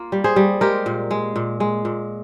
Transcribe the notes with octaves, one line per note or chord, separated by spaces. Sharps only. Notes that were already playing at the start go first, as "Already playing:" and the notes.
Already playing: A#3 F4
G3
G#4 C5
G3
G#3 G4 A#4
A#2
G#3
A#2
G#3
A#2